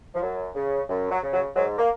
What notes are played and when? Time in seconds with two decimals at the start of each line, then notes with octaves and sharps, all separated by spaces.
0.15 F3
0.22 F#2 F#3
0.55 C#3
0.89 F#2
1.11 F#3
1.22 C#3
1.33 F#3
1.55 G#2 F#3
1.78 A#3